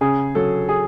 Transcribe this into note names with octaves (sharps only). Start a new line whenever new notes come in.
C#3 G#4
F#3 A4
G#4